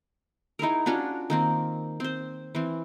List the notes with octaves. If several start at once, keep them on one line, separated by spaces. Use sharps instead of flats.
D#4 E4 G#4 A#4
C#4 D4 F4 F#4
D#3 A#3 C4
C4 C5
E3 C4